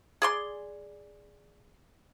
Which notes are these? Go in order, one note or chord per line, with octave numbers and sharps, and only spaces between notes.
G#4 D5 C6